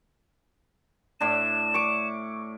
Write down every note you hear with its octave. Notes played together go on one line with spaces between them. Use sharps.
A2 D4 E7
C#6 D6